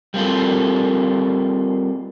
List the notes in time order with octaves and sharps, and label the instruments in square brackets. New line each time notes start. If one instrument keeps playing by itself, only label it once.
[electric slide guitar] G3 A#3 C4 F4 A4